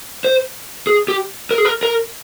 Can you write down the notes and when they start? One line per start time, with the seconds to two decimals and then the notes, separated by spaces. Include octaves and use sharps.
0.25 C5
0.87 G#4
1.08 G4
1.51 A#4
1.58 G#4
1.65 A#4
1.83 A#4